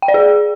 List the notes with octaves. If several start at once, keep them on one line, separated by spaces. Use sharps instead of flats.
G5
D5
G#4